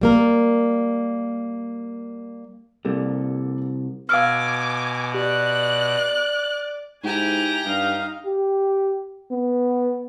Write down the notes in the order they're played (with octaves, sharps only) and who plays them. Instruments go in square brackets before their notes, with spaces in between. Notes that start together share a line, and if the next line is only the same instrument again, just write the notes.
[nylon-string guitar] G3 A#3 A#4
[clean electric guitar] C2 [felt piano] G3 A#3 A4
[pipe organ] B2 [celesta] F5 E6 F6 [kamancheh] G#5 D6
[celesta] G4 [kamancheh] D5 [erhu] F#6
[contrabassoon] G#2 [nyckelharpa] E4 G#5 [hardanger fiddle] G4 A#5
[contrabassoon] G2 [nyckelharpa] D#4 F5
[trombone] G4
B3